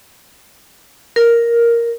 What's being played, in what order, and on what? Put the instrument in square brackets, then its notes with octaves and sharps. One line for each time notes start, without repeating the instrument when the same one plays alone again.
[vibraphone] A#4